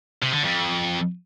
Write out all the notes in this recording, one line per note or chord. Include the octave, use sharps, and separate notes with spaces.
C3
D3
F2